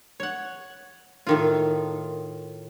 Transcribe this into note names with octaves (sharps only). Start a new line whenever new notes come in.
C#5 F#5
A2 D#3 F4